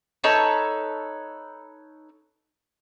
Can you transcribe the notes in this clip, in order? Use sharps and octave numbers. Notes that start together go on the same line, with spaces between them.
D#4 A4 B4 C#5